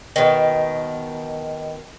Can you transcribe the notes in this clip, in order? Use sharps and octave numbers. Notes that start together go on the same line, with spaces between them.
B2 D#3